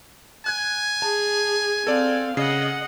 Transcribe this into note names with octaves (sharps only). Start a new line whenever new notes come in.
G#5 F#6 G#6
G#4 A5
C4 A4 D5 F5
C#3 D#5 F#5 C7